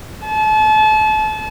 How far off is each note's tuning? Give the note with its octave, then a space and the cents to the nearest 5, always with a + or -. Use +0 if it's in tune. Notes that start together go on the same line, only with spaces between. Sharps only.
A5 -35